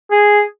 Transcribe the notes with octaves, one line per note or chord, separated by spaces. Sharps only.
G#4